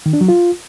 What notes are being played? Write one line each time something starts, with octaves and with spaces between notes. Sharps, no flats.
D#3
D4
F#3
F4